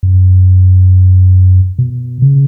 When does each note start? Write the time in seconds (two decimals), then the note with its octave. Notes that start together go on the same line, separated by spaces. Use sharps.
0.03 F#2
1.79 B2
2.22 C#3